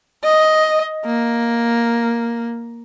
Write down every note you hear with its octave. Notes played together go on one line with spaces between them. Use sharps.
D#5
A#3